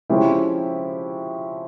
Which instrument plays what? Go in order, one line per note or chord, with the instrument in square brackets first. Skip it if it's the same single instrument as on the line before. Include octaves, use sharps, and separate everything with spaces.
[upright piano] F3 G#3 C#4 E4 G4